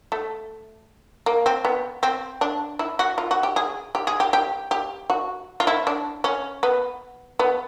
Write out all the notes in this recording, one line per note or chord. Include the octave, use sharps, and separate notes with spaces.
A3
A#3
C4
B3
C4
D4
E4
F#4
F4
F#4
G4
G#4
G4
G#4
G4
G4
G4
F#4
F4
E4
D4
C#4
B3
B3